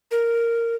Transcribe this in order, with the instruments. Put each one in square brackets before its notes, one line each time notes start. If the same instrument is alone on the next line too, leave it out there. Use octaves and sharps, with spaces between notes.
[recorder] A#4